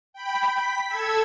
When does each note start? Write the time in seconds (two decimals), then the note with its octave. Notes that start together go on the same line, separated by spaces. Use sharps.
0.13 G5 B5
0.52 B6
0.88 A4 E6 G#6